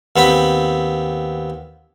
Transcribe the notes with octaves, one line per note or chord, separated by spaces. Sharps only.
D#2 B3 C4 B5